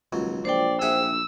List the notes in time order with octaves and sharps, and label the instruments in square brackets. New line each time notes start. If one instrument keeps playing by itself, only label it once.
[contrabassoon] D#1 [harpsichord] C#2 F#3
[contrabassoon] A#1 [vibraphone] C5 G5 [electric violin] D5
[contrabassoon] A#1 [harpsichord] G#4 E5 F#5 [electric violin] E6